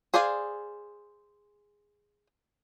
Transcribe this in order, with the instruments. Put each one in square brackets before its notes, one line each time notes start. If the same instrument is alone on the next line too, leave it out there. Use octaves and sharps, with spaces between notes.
[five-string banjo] G#4 C5 D5 F5 G#5